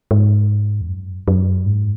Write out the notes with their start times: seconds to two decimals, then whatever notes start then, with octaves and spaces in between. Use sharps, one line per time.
0.11 G#2
0.81 E2
0.89 F#2
1.28 F#2
1.66 G#2